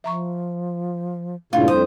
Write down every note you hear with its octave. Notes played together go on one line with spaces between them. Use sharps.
F3 E5 A#5 C#6
G2 A#2 C#3 A3 D4 E4 F4
F2 G3 C5 D#6